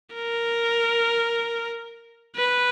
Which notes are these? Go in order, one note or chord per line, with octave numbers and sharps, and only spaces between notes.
A#4
B4